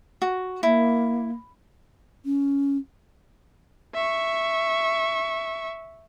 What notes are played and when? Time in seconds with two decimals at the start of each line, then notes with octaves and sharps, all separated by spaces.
0.22 F#4
0.63 A#3 E4
2.25 C#4
3.95 E5 C#6